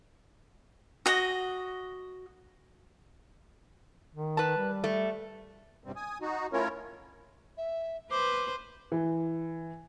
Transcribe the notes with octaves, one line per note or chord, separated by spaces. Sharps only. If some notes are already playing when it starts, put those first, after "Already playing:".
F#4 D#5
D#3
B4 A5
G3
A3
E2 G2 C3 G3 C4
G#5 D#6
D#4 F#4
A3 C#4 E4 F4 A#4 C#5
E5
B4 C5 D6
E3